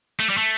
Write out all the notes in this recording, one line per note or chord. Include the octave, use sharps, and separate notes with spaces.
A3
G3
A3